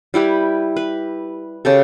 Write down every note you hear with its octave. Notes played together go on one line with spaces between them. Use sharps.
G3 E4 G4 B4
B4
C#3 G4 A4